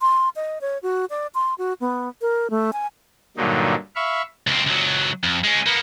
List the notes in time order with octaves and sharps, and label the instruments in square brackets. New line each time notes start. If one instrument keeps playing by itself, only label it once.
[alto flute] C6
D#5
C#5
F#4
D5
C6
F#4
B3
A#4
A3
G#5
[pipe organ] G2 A#2 D3 F#3 D#4
E5 F5 B5 C#6
[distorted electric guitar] C#2 C4
C#2 F#3
F2
G#3 C#4
A#3 B3